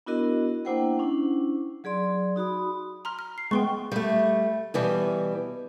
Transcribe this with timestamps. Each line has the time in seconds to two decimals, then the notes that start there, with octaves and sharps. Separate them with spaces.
0.06 B3 D4 E4 F#4 A#4 D#5
0.65 A#3 D4 E4 C5 F#5 G5
0.99 C#4 D4 E4
1.84 F#3 G#4 D5 C6
2.36 D#4 F#4 B5 D#6
3.05 A#5 C6 F6
3.19 F6
3.38 C7
3.51 G#3 B3 G5 C6 C#6
3.92 G3 A3
4.74 B2 E3 G3